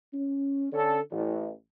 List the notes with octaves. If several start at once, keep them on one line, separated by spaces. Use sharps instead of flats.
C#4
D3 C#4 A4
A1